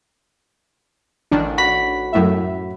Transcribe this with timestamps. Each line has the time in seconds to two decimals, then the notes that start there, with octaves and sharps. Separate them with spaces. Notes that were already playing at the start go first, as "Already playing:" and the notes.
1.31 A1 D#3 D4
1.58 F#4 B5 B6
2.13 F#2 A2 E5